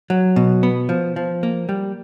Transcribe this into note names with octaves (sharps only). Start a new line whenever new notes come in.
F#3
B2
B3
F3
F3
A#3
G3